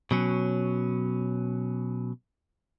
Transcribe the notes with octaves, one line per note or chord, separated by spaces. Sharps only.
B2 F#3 C#4